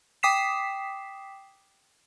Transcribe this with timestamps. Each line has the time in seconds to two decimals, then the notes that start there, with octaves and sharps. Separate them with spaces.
0.23 G5 D6 D#6 B6 C7 E7